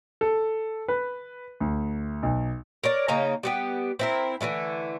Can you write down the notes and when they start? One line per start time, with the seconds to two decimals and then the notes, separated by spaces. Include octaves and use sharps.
0.21 A4
0.88 B4
1.60 D2
2.23 B1
2.84 A#4 C#5 D5
3.08 C#3 A#3 D#4 A#5
3.43 G3 B3 G4
3.99 C4 E4 A#4
4.41 D3 E3 G#3 A3